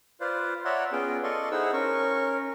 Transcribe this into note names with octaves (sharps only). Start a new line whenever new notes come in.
F4 B4 C5 D5 F5
C#5 D5 E5 F#5 A#5 C6
B3 C#4 F4 G#4 G5
A4 D5 D#5 F5 C6 C#6
D#4 E4 G#4 C5 F#5 E6
C#4 A#4 C#6